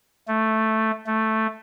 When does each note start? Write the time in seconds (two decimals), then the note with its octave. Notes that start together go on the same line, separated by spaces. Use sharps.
0.28 A3
1.06 A3